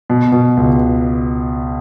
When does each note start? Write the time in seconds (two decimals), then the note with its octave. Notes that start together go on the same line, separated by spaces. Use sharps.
0.10 B2
0.32 B2
0.57 C#2